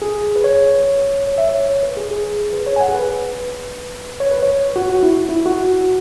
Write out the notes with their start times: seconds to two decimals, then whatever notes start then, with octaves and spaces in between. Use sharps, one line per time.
0.02 G#4
0.36 B4
0.44 C#5
1.27 C#5
1.38 E5
1.49 C#5
1.69 C#5
1.83 B4
1.97 G#4
2.11 G#4
2.53 B4
2.67 C#5
2.76 G#5
2.80 F#5
2.88 G#4
2.95 B4
4.20 C#5
4.31 B4
4.43 C#5
4.76 F#4
4.90 F#4
5.03 E4
5.29 E4
5.46 F#4